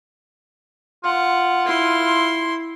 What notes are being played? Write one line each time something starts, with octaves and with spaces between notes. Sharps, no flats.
F4 F#5
E4 C6